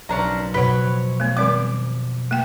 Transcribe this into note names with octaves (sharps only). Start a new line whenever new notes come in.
B1 C#4 D4 B4 A#5
F2 B2 B4 C#5 F#5 B5
A3 B3
D#3 G3 C4 D6
A3 A#3 G5